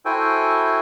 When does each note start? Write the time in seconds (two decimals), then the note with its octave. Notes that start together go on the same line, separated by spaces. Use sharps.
0.05 E4 F#4 A4 C5 G5 G#5